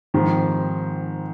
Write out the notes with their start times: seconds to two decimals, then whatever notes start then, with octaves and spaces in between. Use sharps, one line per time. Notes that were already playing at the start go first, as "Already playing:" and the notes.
0.14 G#2 D#3 F3 C4 G4